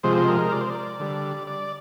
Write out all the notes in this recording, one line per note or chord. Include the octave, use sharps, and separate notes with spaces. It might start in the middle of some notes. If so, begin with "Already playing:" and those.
C3 F3 G#3 C5
A#4
D5
C5
D5
D3 G3
D5